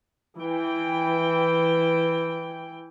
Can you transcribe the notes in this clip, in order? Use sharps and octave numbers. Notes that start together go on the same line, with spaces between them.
E3 G5